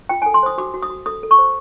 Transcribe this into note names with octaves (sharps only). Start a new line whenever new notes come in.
F4 G5
A4 G#5
C6
C5 D#6
F#4 D6
F#4
D#6
F#4
A4 D#6
A4
C#6
C5